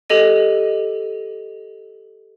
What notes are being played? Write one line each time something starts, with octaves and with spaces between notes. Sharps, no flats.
G4 A4 D#5 D#7